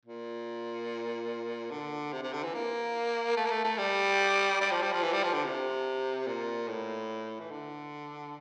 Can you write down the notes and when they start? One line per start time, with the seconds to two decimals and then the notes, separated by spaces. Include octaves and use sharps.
0.05 A#2
1.71 D3
2.12 C3
2.23 C3
2.33 D3
2.43 E3
2.54 A#3
3.37 A3
3.45 A#3
3.50 A3
3.64 A3
3.78 G3
4.61 G3
4.71 F3
4.82 G3
4.92 F3
5.03 E3
5.13 G3
5.23 F3
5.34 D3
5.44 C3
6.27 A#2
6.68 A2
7.40 E3
7.51 D3